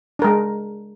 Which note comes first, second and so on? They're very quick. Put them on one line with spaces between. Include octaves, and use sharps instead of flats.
D4 A#4 G#3